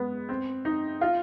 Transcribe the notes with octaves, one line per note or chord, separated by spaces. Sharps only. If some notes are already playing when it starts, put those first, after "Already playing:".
Already playing: G#3 B3
C4
D#4
F4